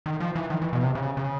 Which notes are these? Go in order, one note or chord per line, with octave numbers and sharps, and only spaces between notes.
D#3
F3
E3
D#3
E3
B2
C3
C#3
C#3